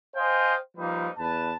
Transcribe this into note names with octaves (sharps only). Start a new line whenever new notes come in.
C5 D#5 F5 G5 G#5
F3 G3 A#3 D#4 B4
E2 B4 A5